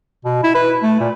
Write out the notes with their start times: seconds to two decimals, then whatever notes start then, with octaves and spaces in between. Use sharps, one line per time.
0.25 B2
0.44 E4
0.55 B4
0.83 A3
1.00 A#2